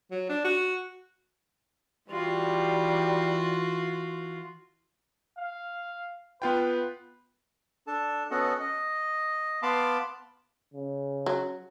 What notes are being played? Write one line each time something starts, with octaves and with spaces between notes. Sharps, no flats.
F#3
D4
F#4
E3 G3 F4 F#4
F5
B3 F4 B4 G5
D4 A4 A5
B3 C#4 F#4 A4 D#5 F#5
D#5
B3 F5 A5 B5 C6 D6
C#3
F#3